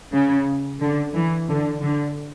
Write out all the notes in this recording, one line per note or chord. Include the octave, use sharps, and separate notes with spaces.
C#3
D3
E3
D3
D3